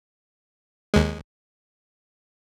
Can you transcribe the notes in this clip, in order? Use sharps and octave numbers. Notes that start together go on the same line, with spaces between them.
D#2 G#3